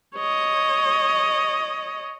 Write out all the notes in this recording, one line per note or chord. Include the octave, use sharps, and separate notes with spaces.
C#5 D#5